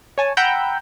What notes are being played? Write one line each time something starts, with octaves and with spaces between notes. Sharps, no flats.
C#5 G#5 A5
F#5 G5 A#5 B5 E6 G6